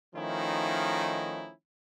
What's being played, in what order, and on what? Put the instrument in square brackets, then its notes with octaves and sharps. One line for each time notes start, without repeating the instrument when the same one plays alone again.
[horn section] D#3 F3 A3 C#4 D#4 E4